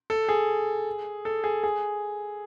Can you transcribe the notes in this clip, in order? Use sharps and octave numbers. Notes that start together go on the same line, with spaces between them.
A4
G#4
A4
G#4
G#4